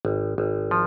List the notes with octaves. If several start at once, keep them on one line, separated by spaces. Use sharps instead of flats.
G#1
G#1
F3